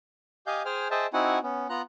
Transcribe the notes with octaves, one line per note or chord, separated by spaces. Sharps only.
G4 D#5 F5 G#5 G6
G#4 C5 G5 G#5 F6
G#4 C5 D#5 E5 G5 A5
C4 D#4 E4 F#4 F#5 G#5
B3 C#4
B3 F4 A#5 F#6